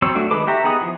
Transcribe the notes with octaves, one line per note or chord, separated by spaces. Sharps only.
F#3 C4 C5 C#5 E6
A3 D4 F#4
D#3 G#3 A4 B4 D6
F#4 G4 E5 A#5
B3 D#4 G#4 F#5 D#6
E3 F3 G#4